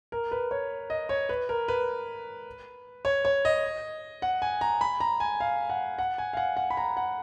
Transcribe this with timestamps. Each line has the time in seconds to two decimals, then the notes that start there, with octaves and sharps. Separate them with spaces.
0.12 A#4
0.32 B4
0.51 C#5
0.90 D#5
1.09 C#5
1.29 B4
1.49 A#4
1.68 B4
3.05 C#5
3.25 C#5
3.45 D#5
4.22 F#5
4.42 G#5
4.61 A#5
4.81 B5
5.00 A#5
5.20 G#5
5.40 F5
5.70 F#5
5.98 F#5
6.18 G#5
6.33 F5
6.37 F#5
6.57 F#5
6.70 B5
6.77 A#5
6.97 F#5